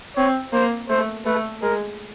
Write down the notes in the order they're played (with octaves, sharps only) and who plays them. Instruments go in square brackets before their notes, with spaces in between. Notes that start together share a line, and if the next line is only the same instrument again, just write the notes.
[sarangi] C4 [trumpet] C#5
[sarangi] A#3 [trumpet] C5
[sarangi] A3 [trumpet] C5
[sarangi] A3 [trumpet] B4
[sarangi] G#3 [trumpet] A#4